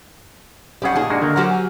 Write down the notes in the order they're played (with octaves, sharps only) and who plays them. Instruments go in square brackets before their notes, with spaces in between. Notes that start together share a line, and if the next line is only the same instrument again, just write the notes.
[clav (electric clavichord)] B1 G3 G#4 [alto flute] C#4 [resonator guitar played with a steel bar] G4 F#5
[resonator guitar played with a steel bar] A#2 G#4 [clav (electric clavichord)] D#3 [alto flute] D#4
[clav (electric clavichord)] G#3 A#3 F#4 [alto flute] D4
[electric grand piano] D3 [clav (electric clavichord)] D#3 A#3 [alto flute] A#4
[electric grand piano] F#3 F6 [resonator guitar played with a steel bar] F#4 G4 F#5 [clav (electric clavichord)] C5
[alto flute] G#5